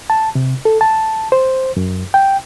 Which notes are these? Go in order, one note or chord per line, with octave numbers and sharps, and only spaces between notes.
A5
C3
A4
A5
C5
F#2
G5